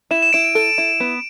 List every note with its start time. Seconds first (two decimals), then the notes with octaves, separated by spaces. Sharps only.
0.11 E4 E7
0.22 E7
0.33 E4 D7
0.45 D7
0.55 A4 D7
0.78 E4
1.00 B3